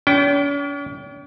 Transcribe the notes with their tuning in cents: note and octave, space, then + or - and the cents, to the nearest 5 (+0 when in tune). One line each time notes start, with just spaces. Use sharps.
C#4 +45 G5 -20